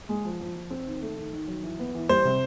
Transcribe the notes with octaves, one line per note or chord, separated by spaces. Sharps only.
G#3
F3
F3
F3
C4
D#3
A3
D#3
D#3
F#3
E3
B3
E3
G3 C5
C3